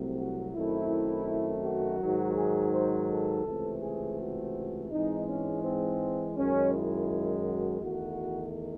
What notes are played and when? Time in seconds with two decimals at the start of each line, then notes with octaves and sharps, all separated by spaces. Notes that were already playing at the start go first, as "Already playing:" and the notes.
Already playing: C2 C3 F#3 A3 C4
0.16 F#4
0.53 F#2 D#3 A3 C4 E4
1.63 F#4
1.98 G#2 D#3 F#3
2.35 G#4
2.72 C5
3.08 A4
3.44 C#2 C3 E3 A3 C4
3.81 G#4
4.18 F#4
4.90 G#2 E3 G#3 C4 D#4
5.27 C#4
5.63 C4
6.36 F#2 D#3 G#3 C#4
6.72 E4
7.45 F#4
7.81 E2 D#3 A3 F#4